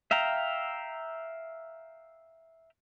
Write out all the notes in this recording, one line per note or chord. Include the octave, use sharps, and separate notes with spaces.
E5 F5 G5 A#5